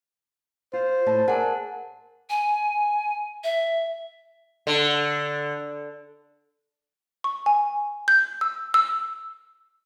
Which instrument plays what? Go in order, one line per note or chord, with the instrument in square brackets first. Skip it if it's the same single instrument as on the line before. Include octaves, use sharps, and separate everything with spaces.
[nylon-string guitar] F4 [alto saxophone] C5
[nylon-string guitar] A2 A5
[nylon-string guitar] G#4 D5 [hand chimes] A#4 F#5 A5
[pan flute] G#5
E5
[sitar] D3
[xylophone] C#6
G#5
G6
E6
E6